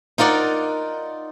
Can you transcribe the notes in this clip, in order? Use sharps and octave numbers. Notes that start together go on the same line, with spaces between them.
D#4 F4 A#4 D5 F#5